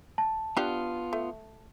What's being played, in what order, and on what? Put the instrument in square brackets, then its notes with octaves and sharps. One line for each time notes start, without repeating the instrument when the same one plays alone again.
[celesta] A5
[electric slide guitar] B3 F4 [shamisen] D4 G4 F#5
[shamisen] A3